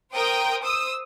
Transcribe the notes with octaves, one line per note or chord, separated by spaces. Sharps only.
A#4 C5 G5 D#6
C5 D#6 E6